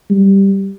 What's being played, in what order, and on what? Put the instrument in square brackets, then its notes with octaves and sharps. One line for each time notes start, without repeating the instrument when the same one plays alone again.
[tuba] G3